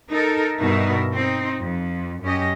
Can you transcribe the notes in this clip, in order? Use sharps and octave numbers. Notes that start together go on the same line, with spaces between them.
D#4 A4 A#4
G2 B2 D#4 A#4 E5
C4 D#4
F2
F#2 C#4 G4 D#5